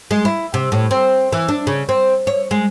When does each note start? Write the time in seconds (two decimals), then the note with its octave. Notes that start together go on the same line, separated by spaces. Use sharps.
0.11 G#3
0.25 E4
0.54 C3
0.72 A2
0.91 C4
1.32 E3
1.48 D4
1.67 C#3
1.89 C4
2.27 C#5
2.51 G#3